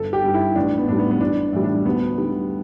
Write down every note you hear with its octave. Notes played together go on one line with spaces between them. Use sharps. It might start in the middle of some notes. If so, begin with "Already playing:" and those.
Already playing: G1 A4
G4
G2 G3
E4
A1 D4
B3
A2 G3 D4
B3
B3
A1 D4
A2 E3 G3
D4
D2 B3
D3 G3